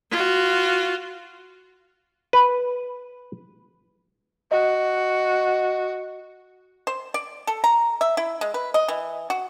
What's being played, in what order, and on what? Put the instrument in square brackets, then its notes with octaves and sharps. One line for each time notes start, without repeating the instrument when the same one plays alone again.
[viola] F4 F#4
[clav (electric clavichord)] B4
[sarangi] F#4 [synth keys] D#5
[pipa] C5
D5
A4
A#5
E5
E4
G#3
B4
D#5
E3
F#4